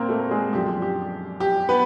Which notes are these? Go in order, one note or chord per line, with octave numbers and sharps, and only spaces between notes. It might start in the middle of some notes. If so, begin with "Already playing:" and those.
Already playing: A#2 A#3 C4 A#4
A3 A4
G#3 G#4
F#2 D3 F3 G#3 G4
G4
G4
B3 B4